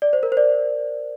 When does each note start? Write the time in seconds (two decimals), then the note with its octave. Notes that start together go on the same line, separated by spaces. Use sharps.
0.02 D5
0.13 C5
0.23 A#4
0.32 C5
0.37 D5